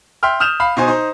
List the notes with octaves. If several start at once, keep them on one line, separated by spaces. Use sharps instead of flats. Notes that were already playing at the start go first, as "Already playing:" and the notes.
E5 G5 C6 F6
D#6 F6 G6 E7 F7
F5 B5
B2 D#4 C5 G#5
D#4 C5